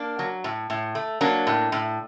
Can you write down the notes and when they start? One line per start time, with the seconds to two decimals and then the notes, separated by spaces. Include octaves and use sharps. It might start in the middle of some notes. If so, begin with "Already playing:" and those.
Already playing: A#3 D4
0.19 F#3
0.44 A2
0.70 A2
0.95 A3
1.21 F#3 A#3 D4
1.47 A2
1.72 A2